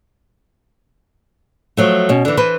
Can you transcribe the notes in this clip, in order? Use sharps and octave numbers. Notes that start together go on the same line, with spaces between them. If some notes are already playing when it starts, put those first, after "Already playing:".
F3 F#3 A3
B2 C#4
D3 E3
E3 B4 C5